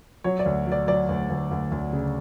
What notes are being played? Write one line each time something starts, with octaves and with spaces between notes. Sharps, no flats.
F#3 C#5
D5
D2
F#3 D5
F#3 D5
D2
D2
D2
D2
C#3